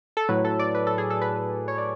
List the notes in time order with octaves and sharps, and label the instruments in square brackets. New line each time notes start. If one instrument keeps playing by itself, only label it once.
[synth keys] A4
A2 F#3 B4
A4
D5
B4
A4
G#4
A4
B4
C#5
D5